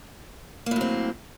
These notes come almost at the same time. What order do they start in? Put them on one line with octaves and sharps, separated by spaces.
A#3 A2 F#3 C4